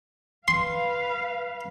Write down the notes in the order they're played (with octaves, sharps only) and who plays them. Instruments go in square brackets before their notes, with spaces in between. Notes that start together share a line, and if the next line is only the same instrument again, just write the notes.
[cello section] B4 F5 [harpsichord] C6